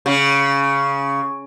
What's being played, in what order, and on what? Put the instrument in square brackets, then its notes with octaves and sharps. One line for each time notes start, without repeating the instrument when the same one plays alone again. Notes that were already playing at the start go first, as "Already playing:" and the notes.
[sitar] C#3